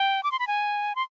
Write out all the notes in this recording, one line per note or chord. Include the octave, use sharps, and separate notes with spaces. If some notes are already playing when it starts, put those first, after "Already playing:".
Already playing: G5
D6
C6
B5
G#5
C6